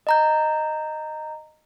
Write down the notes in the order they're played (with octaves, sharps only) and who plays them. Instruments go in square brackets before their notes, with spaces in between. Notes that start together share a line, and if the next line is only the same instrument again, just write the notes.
[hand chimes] D#5 A#5 G6